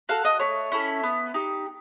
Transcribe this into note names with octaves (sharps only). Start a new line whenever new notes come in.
F#4 A4 F5
D#5
A3 C#5
C#4 E4 A4
B3
D#4 G4